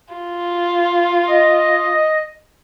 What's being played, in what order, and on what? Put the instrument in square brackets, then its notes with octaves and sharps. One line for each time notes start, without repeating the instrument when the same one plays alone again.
[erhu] F4
[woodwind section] D#5